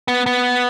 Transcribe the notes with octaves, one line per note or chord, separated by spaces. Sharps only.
B3
B3